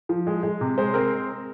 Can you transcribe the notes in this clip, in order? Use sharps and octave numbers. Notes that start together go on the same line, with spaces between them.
F3
G#3
G#3
C3
G#3 C5
C4 A#4